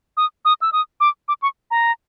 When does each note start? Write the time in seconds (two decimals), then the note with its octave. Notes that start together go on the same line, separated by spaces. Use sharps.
0.17 D#6
0.45 D#6
0.62 E6
0.73 D#6
1.00 D6
1.28 D6
1.42 C#6
1.71 A#5